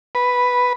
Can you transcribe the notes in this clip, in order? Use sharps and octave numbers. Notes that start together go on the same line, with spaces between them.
B4